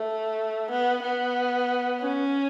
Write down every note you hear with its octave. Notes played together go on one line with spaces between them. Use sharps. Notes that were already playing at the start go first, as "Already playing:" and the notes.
Already playing: A3
B3
B3
C#4